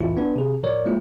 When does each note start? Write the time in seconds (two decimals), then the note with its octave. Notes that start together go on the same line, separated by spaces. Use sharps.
0.01 C2 F2 A2 E3 E4 F4
0.17 B3 D4 B4
0.36 C3 G#4
0.63 A2 F3 A#4 C#5 D5
0.85 F3 G#3 A#3 E4 F4